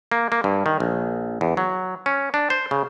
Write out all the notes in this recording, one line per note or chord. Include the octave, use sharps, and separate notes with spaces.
A#3
A#3
G2
D#3
A#1
E2
F#3
C#4
D4
C5
C#3